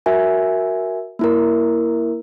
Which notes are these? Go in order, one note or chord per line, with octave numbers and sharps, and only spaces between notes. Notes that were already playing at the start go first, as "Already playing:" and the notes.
F#4 A#4 E5 G#5
A#3 E4 A#4